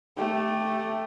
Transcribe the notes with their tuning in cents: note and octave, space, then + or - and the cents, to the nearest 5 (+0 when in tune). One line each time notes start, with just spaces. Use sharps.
A3 +0 G4 +0